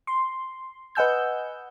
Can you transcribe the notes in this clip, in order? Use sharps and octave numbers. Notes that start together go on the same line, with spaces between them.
C6
B4 D#5 F#5 G#5 E6 G6